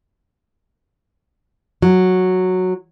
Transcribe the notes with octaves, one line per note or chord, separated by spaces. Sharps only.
F#3